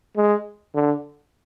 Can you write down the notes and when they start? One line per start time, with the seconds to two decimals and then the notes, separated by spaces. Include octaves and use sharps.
0.17 G#3
0.75 D3